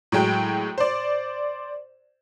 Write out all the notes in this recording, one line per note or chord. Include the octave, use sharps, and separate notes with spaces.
A2 F#3 G#3 G5
C5 D5